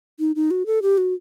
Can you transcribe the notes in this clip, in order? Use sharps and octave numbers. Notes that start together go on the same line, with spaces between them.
D#4
D#4
F#4
A4
G4
F#4